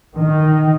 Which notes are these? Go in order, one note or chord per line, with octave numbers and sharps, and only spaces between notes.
D#3